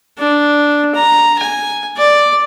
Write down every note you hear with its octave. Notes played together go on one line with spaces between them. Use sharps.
D4
A#5
G#5
D5